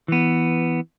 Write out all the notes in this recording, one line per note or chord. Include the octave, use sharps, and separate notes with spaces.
E3 B3